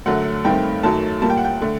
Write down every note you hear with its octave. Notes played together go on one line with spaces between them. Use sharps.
F#2 D3 F#3 A3 F#5
G2 D#3 A3 C4 G5
F#2 D#3 F#3 A3 A5
A#2 G3 A#3 A5
G5
F#5
G5
D3 A3